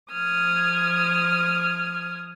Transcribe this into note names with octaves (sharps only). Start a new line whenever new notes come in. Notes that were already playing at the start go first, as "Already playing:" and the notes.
F3 D#6 F6 G#6